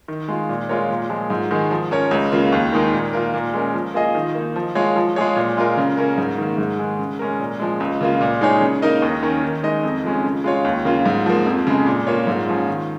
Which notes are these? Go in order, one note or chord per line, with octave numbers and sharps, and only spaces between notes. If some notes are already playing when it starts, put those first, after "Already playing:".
D#3
G#3 F4
A#2
G#3 F4 A#4 C#5
A#2
F3 G#3
G#2
D#3 G#3
F3
C#4 A#4 C#5
C#2
C#3 A#3 F4
D#2
D#3 G#3 D#4 A#4
A#2
A#3 F4 A#4
A#2
G#3 C#4 A#4
F3
A#3 F4 G#4 D#5
D#3
A#3 D#4
F3
G#3 F4 C#5
F3
G#3 F4 G#4 C#5
A#2
G#3 F4 A#4
C#3
A#3 C#4 A#4
G#2
D#3 A#3
G#2
D#3 G#3
C#3
G#3 C#4 A#4
A#2
F3 G#3
C#2
C#3 A#3 F4
A#2
G#3 D#4 G#4 C#5
C#3
A#3 D#4 A#4 D#5
D#2
D#3 C#4 A#4
D#3
G#3 D#4 A#4 D#5
F2
F3 G#3 C#4
C#3
G#3 F4 C#5
D#2
C#3 A#3 F4
G#2
F3 A#3
F2
C#3 G#3
A#2
A#3 F4 C#5
G#2
F3 C#4 F4
D#3